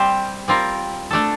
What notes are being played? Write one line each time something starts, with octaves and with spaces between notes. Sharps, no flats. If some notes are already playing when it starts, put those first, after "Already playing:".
Already playing: G3 C4 G4 C5
G3 C4 F4 A#4
A3 D4 A4